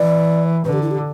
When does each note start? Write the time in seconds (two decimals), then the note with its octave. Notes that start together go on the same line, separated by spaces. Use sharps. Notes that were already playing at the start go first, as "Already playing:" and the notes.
Already playing: E3 D5
0.64 D3 B4
0.73 G4
0.82 E4
0.91 G4